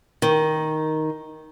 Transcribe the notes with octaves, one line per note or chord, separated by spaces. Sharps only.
D#3